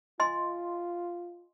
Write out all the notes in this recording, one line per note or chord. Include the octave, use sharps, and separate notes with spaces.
F4 D#5 G#5 C6